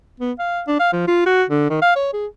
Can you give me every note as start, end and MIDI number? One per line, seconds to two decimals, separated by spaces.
0.20 0.32 59
0.39 0.62 77
0.67 0.79 62
0.80 0.90 77
0.92 1.03 53
1.07 1.21 65
1.26 1.43 66
1.50 1.68 50
1.70 1.81 51
1.82 1.94 77
1.96 2.09 73
2.13 2.26 68